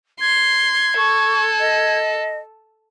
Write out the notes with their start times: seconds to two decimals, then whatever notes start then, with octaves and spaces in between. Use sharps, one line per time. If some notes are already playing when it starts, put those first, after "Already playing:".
0.20 C6 G#6
0.97 A4 C#6
1.60 D#5